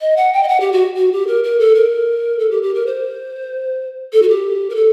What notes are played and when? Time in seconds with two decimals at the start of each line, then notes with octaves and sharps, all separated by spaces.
0.01 D#5
0.17 F#5
0.33 G5
0.43 D#5
0.48 F#5
0.60 G4
0.72 F#4
0.96 F#4
1.12 G4
1.27 A#4
1.44 A#4
1.60 A4
1.75 A#4
2.39 A4
2.51 G4
2.63 G4
2.75 A#4
2.86 C5
4.13 A4
4.22 F#4
4.29 G4
4.70 A#4
4.75 A4